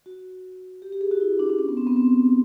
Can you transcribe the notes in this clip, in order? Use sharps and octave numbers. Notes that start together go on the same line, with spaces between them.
F#4
G4
G4
G#4
F#4
E4
D4
D4
C#4
B3
C4
B3
C4